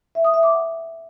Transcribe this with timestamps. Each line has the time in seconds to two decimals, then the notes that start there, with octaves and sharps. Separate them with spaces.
0.15 E5
0.24 D#6
0.34 E5
0.43 D6
0.52 F#5